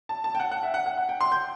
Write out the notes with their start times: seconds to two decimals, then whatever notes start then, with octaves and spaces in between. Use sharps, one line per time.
0.09 A5
0.24 A5
0.35 G5
0.39 F#5
0.51 F#5
0.63 E5
0.74 F#5
0.86 F#5
0.97 F#5
1.09 G5
1.21 C6
1.32 G6